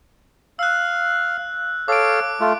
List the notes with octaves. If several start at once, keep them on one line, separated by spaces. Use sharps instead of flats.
F5 E6 F#6
A4 C#5 F5 D6 D7
A3 F4